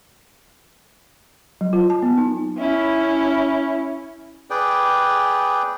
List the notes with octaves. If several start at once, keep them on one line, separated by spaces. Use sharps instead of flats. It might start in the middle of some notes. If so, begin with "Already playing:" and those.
F#3
F4
A5
B3
D#4
C#4 E4
G#4 B4 D5 G5